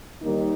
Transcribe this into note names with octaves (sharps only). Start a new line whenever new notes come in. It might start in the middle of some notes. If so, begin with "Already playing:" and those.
D#2 D#3 G3 A#3 D#4